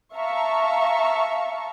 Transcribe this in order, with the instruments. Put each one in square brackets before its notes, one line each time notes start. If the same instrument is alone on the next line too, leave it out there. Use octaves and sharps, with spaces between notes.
[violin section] E5 F5 A5 A#5 C#6